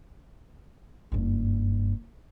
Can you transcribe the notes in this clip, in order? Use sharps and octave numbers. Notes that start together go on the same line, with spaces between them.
F#1 G2